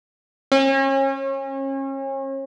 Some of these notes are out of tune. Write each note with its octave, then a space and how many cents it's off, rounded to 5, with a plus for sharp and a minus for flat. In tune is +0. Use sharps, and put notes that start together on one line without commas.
C#4 -35